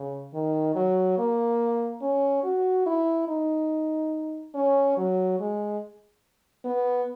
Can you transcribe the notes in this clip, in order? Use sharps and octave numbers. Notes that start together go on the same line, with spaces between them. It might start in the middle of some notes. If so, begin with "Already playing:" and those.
Already playing: C#3
D#3
F#3
A#3
C#4
F#4
E4
D#4
C#4
F#3
G#3
B3